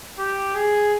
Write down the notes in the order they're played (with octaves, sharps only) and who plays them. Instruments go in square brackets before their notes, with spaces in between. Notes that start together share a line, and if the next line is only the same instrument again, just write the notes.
[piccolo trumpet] G4
G#4